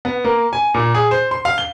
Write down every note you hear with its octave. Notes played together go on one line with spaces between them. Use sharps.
B3
A#3
G#5
A#2
G#4
C5
C6
F5
G7